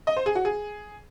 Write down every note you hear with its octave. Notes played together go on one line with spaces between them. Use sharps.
D#5
C5
G#4
F#4
G#4